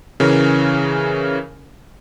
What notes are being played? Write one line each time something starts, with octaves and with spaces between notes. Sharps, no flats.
C#3 E3 C#4 A#4